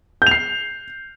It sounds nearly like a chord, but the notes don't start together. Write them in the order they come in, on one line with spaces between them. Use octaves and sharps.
G6 F7 C7